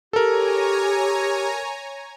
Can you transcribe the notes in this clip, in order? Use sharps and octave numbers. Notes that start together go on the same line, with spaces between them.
G4 A4 A#4 C#5 G#5 A#5